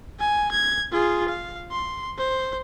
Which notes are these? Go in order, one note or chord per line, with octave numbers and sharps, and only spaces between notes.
G#5
G#6
F4 G#4
F5
C6
C5